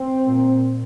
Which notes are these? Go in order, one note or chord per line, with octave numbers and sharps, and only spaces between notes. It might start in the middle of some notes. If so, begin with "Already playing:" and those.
Already playing: C4
A#2